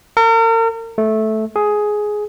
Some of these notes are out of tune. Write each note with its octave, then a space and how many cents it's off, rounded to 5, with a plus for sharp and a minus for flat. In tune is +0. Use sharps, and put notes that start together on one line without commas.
A#4 -40
A3 -10
G#4 +10